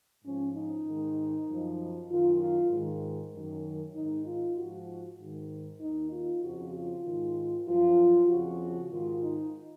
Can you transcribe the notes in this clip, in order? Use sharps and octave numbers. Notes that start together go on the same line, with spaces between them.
G#2 F3 C#4
D#4
G#2 D#3
F#2 F3
F#2 D#3 F4
F4
G#2
D#3
F#2 D#3
G#2 D#3 D#4
F4
G#2 F3 F#4
G#2 D#3
D#2 D#3 D#4
F4
F2 C#3 F3 F#4
F4
G#2 D#3
F#2 F3 F4
F2 C#3 F3 F#4
G#2 D#3 F4
D#4